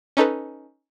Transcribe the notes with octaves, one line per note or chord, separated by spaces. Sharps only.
C#4 D#4 A4 B4